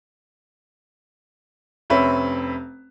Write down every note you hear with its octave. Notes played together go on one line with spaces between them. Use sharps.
F1 C4 C#4 B4 E5